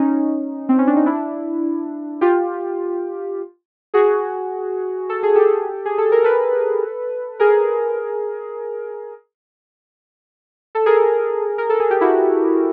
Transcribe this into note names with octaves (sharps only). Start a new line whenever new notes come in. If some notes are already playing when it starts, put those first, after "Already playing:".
Already playing: C#4 D#4
C4
C#4
D4
D#4
D4 E4
F4 G4
F#4 G#4
A4
G#4
G4 A4
G#4
A4
A#4
A4 B4
G#4 A#4
A4
G#4 A#4
A#4
A4
G#4
G4
E4 F#4